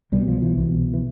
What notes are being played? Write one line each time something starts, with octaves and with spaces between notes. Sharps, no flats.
C2 B2 G3
F3
E3
C2 B2
E3